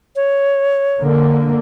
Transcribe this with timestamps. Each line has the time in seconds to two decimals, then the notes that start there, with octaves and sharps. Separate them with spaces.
0.16 C#5
1.01 D3 A#3